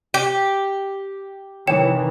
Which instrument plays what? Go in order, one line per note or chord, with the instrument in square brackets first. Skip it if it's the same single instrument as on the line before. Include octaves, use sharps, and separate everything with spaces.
[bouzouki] G4 [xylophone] G7
[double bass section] C3 D#3 E3 [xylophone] C#5 G5 E7